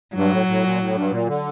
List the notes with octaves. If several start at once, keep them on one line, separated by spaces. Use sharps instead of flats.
G2 F#3
A2
A2
A#2
A2
G2
A#2
D3